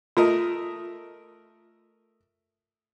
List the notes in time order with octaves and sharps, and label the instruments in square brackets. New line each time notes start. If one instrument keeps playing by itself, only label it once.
[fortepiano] A3 A#4 D#5 [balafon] F4